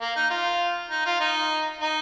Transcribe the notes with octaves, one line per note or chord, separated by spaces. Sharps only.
A#3
D#4
F4
D#4
F4
D#4
D#4